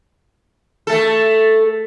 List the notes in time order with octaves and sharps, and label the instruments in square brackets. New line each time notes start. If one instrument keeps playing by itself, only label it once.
[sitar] A3 A4